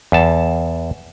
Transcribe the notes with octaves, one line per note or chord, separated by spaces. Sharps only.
E2 A5